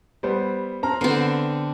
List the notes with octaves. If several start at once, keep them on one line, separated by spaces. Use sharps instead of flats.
G3 B3 C5
C4 A#5 F6
D3 B3 C4 C7